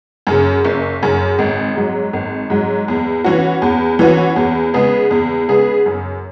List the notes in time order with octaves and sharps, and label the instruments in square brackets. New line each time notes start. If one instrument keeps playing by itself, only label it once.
[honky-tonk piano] F#2 C#3
F#1
F#2 C#3
G#1
G#2 F#3
G#1
G#2 F#3
E2
E3 C#4 F#4
E2
E3 C#4 F#4
E2
C#3 G#3 B3 G#4
E2
C#3 G#3 B3 G#4
F#2